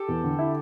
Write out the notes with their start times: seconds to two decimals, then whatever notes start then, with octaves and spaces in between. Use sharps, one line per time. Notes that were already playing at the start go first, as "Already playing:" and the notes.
Already playing: G4 A4
0.08 E2
0.24 D3
0.39 E4